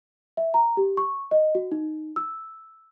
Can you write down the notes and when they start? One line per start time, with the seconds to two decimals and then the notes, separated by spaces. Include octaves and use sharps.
0.37 E5
0.54 A#5
0.77 G4
0.97 C#6
1.31 D#5
1.55 F#4
1.72 D#4
2.16 E6